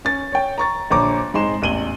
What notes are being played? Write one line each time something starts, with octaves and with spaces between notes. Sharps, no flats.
C#4 A6
C#5 G5
A#5 C#6 A6
A#1 D3 C5 C#5 A#5 D6
G#2 G#3 C4 D#4 C6 E7
A1 E2 D#7 F#7 G7